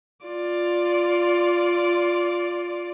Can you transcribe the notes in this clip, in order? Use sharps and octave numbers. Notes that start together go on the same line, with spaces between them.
F4 D5